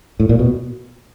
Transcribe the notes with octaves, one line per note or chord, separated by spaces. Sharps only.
A2
A#2
B2